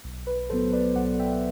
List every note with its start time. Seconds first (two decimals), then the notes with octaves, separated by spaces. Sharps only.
0.04 B1
0.27 B4
0.49 A2 F#3 B3 A4 C5
0.72 B4 D5
0.96 B1 D5 F#5
1.19 E5 G5